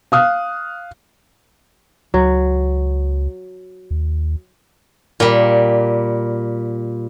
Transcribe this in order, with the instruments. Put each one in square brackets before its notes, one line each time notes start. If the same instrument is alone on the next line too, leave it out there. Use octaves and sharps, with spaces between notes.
[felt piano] F5 D#6 F6 F#6
[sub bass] C#2 [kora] F#3
[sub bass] D#2
[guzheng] A#2 G3